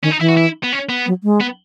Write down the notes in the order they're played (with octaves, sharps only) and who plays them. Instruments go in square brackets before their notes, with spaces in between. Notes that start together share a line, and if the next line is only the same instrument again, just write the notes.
[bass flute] D#3 [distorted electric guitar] C#4
[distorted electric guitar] D#4
[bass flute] E3 [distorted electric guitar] E4
[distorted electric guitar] F#4
E4
B3
C#4
B3
[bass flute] F#3
G#3
[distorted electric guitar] B3